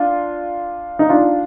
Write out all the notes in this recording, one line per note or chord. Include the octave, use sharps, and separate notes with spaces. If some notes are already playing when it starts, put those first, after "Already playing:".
Already playing: D4 F4
D#4
D4 F4